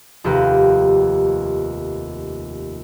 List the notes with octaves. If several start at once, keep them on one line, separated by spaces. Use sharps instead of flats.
F1 D#2 A#3 G4 B4